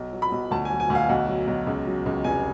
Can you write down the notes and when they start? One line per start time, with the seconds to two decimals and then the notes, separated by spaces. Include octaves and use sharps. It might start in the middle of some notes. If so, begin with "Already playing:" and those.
Already playing: B1
0.13 F#3
0.22 B5
0.32 B1
0.51 D2 A5
0.65 G#5
0.71 F#3
0.80 G#5
0.90 D2
0.95 F5
1.09 B1 F#5
1.28 F#3
1.47 B1
1.67 C#2
1.87 F#3
2.06 C#2
2.24 F1 G#5